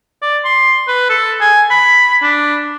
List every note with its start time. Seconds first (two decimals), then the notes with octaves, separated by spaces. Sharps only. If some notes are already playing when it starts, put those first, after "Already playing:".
0.22 D5
0.45 C6
0.88 B4
1.09 A4
1.41 G#5
1.70 B5
2.22 D4